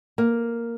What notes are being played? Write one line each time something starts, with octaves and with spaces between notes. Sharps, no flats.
A#3